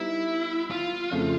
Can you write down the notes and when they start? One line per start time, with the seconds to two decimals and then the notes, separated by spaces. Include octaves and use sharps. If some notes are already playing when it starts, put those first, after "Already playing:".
Already playing: G3 B3 D#4 E4
0.71 F4
1.11 F2 C#3 F3 A3